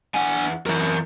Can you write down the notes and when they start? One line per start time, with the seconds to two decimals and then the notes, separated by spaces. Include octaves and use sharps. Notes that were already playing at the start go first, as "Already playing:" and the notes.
0.14 E2 D4 F#5 G#5
0.66 F#2 E3 A#4 E5